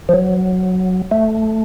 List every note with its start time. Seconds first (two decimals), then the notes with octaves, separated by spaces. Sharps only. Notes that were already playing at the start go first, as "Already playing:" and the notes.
0.09 F3
0.13 F#3
1.11 A3